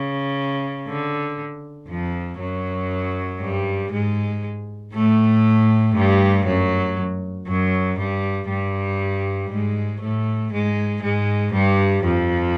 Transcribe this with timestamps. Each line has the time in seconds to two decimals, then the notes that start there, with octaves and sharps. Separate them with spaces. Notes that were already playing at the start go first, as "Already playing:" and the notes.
Already playing: C#3
0.88 D3
1.90 F2 F3
2.40 F#2 F#3
3.41 G2 G3
3.92 G#2 G#3
4.94 A2 A3
5.96 G2 G3
6.46 F#2 F#3
7.48 F#2 F#3
7.98 G2 G3
8.49 G2 G3
9.51 G#2 G#3
10.01 A2 A3
10.52 G#2 G#3
11.03 G#2 G#3
11.54 G2 G3
12.05 F2 F3